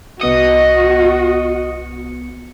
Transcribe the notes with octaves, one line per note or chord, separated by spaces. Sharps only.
C2 B3 F#4 D#5 C#7